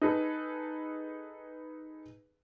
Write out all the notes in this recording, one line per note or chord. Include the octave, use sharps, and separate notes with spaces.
D#4 G#4 A4 B4